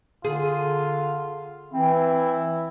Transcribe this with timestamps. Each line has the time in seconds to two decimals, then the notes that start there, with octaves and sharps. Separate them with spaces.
0.24 D3 F4 G#4
1.74 E3 C4 E4